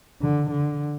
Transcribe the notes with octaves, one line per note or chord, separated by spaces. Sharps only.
D3
D3